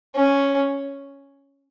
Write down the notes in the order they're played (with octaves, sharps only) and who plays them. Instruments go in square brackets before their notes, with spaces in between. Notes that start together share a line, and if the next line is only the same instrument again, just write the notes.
[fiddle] C#4